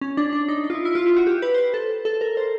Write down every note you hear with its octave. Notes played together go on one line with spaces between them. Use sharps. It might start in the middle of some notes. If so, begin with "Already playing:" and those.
C#4
D4
D4
D#4
D#4
F4
E4
E4
F4
E4
F#4
G4
B4
C5
B4
A4
A4
A#4
C5